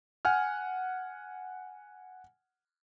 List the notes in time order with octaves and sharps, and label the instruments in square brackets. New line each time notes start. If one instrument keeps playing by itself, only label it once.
[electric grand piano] F#5 G#5 F6